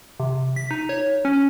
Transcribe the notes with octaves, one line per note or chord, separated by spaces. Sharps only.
C3
B6
D#4
C#5
C#4